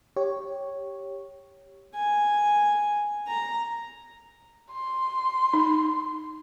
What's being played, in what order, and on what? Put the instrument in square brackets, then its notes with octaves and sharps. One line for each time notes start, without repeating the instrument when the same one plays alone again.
[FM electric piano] G4 C#5
[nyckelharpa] G#5
A#5
[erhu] C6
[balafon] D#4